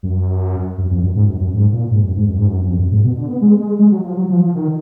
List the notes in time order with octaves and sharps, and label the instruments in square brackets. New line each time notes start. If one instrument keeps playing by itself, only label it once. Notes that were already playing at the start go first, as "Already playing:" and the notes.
[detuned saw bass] F#2
F#2
F2
F#2
G#2
F#2
F#2
G#2
A#2
G#2
F#2
G#2
F#2
G#2
F#2
F2
F#2
G#2
B2
D3
B3
G#3
G#3
G#3
F#3
F3
F#3
F3
F3
D#3